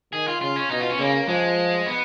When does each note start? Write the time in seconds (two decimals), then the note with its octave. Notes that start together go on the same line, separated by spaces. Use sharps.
0.13 D#3 G#4
0.28 F4
0.41 C#3 F4
0.56 C#4
0.70 B2 D#4
0.80 F4
0.89 C#4
0.99 C#3 A#3
1.28 F3 G#3
1.86 B3